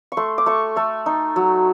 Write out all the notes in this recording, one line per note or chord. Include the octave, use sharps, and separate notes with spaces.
C#6
A3 C6
D6
A3 C#6
A3 C#6
D#4
F#3